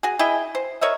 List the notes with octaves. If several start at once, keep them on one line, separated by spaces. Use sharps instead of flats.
F#4 G#4
E4 G#4 D#5 G5
C5
A#4 C#5 D#5 E5